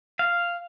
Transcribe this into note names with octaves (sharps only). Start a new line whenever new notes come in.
F5